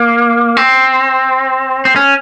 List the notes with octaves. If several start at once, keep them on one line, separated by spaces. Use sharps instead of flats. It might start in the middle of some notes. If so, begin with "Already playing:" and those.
Already playing: A#3
C4
C4
C#4